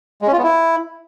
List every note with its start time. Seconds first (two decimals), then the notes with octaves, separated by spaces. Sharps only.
0.22 G#3
0.27 C#4
0.33 F4
0.38 B3
0.43 E4